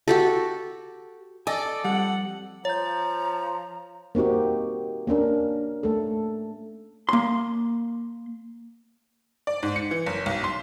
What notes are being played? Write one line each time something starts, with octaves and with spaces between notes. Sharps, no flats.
F#4 G4 A4
A4 D5 D#5 G#5
F2 G3 F#5
F3 C#5 A#5 G6
A#3 C4 D#4 F#4 G4
A#3 C#4 D4 A#4
A3 A4
A#3 C6
D5
G#2
C#7
E3
F#1
B1
C6